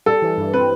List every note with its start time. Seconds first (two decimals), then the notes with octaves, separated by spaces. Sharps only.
0.06 G3 A4
0.22 E3
0.37 G2
0.54 C4 B4